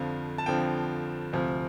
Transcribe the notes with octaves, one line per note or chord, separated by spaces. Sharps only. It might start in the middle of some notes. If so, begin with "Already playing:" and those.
Already playing: F2 D3 F3 F5
A5
F2 D3 F3 G5
D2 C3 F3